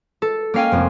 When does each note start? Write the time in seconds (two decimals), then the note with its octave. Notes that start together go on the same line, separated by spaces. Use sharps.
0.22 A4
0.54 A#3 C#4 F5 G5 G#5
0.72 F1 F2